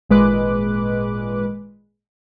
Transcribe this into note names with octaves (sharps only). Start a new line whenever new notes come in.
G#1 A#2 G#3 B4 D6 F#6